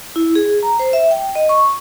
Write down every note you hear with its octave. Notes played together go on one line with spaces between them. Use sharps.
E4
G#4
A#5
C5
E5
G5
D#5
C#6